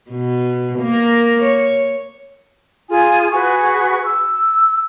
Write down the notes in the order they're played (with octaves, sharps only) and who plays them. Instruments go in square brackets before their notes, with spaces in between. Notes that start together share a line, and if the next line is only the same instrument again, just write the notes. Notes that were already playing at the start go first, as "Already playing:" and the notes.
[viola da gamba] B2
A#3 A#4
C#5
[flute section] F4 G#4 G#5
F#4 G#4 B4 C#6
E6